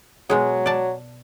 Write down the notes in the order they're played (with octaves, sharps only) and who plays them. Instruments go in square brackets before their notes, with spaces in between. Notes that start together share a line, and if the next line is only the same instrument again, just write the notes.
[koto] B2 G#3 G#4 [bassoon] F#3
[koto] D5 A5